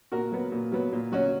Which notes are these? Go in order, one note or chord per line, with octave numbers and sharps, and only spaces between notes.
A#2 F#4 A#4
F#3 B3
A#2
F#3 B3
A#2
F#3 C#4 F#4